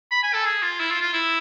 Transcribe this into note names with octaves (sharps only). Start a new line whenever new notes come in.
B5
G#5
A4
G#4
F4
E4
F4
F4
E4